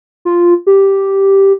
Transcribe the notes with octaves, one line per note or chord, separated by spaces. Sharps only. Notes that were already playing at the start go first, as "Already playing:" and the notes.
F4
G4